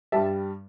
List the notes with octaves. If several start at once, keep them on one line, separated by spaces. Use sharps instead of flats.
G2 G3 E5 A5